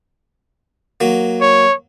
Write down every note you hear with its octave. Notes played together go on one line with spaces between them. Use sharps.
F#3 A#3
C#5